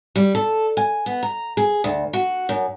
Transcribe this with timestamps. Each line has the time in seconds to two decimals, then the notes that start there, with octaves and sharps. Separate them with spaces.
0.16 G3
0.35 A4
0.77 G#5
1.06 B3
1.23 A#5
1.57 G#4
1.84 D2
2.13 F#4
2.49 F#2